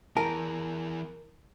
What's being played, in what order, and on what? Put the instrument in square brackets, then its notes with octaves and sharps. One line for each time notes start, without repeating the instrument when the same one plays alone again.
[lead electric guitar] E3 G#4 [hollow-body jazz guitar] A#4 [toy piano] A5